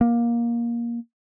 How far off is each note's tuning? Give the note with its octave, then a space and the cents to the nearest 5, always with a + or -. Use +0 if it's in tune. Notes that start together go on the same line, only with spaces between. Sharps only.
A#3 +15